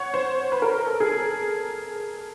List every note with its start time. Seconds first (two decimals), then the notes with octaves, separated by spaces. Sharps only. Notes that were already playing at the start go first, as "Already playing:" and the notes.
Already playing: C#5 F#5
0.14 C5
0.52 B4
0.62 A#4
0.87 A4
1.00 G#4
1.11 A4